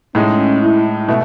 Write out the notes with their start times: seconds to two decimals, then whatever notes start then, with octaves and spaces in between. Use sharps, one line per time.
0.15 A2 G#3 C#4 D#4
0.62 E4
1.08 B2 A3